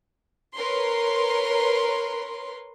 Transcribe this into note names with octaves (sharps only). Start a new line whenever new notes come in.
A#4 B4 C#5 C6